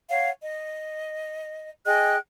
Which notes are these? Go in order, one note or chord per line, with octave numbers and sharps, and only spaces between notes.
C#5 F5 F#5
D#5
G#4 D#5 G5 F#6